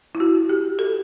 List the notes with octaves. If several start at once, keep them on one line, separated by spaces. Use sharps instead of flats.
E4
F#4
G4
A4